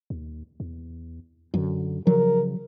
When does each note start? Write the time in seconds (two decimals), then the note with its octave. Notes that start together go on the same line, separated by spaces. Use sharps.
0.10 D#2
0.60 E2
1.54 F#2 D3
2.07 C#3 F3 F#3 A#4